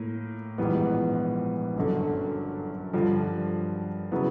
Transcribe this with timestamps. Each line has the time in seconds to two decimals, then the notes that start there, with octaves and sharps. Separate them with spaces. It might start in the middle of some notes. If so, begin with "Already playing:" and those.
Already playing: A2 A#3
0.58 A#1 G#2 E3 G3 B3
1.76 G1 F#2 D3
2.93 G2 D3 F3
4.12 C#3 F#3 B3 E4